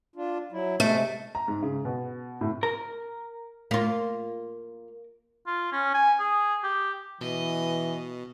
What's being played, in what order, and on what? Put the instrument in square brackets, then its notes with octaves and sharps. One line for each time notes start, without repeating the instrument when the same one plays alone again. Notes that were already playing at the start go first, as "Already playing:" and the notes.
[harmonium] D4 F4
F#3 E4
[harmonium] C3 G#3 [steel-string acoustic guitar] A3
[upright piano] A#5
G#2
C#3
B2
A2
[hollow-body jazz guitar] A#4
[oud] A#3 F4
[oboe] F4
C#4
G#5
G#4
G4
[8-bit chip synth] B2 [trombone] E3 [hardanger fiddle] D#5